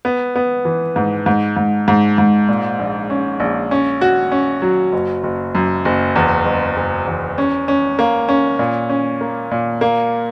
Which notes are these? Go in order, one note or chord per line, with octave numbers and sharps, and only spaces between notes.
B3
B3
E3
G#2
G#2
G#2
G#2
G#2
A#2
A#1
C#4
A#1
C#4
F#4
C#4
F#3
F#1
F#1
F#2
F#1
E2
F#1
F#1
E2
C#4
C#4
A#3
C#4
A#2
C#4
A#3
A#2
A#3